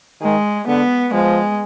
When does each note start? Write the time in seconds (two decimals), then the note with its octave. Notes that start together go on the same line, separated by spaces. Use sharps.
0.22 D#3 G#3
0.67 D3 B3
1.13 F3 G#3